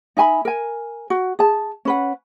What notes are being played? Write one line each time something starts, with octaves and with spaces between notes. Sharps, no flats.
D#4 E5 G#5 B5
A#4 G#5
F#4
G#4 A5
C#4 B4 F#5